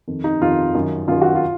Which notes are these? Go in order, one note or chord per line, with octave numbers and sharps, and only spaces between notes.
F2 D#3
D#4
F2 D#3 F4
F#2 D#3
F#2 D#3 F4
F#4
F4